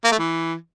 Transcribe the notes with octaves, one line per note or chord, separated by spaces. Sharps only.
A#3
A3
E3